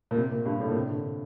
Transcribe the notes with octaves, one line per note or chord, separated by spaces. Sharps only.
A#2
C3
A#2
G2
A2
A#2
C3
D3